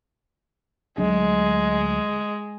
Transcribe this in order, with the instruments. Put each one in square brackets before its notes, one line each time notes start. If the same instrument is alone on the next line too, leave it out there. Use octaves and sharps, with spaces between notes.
[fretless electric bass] D2 F#3 D4 [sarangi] G#3